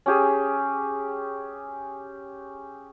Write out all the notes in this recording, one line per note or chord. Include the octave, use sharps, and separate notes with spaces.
C#4 G4 G#4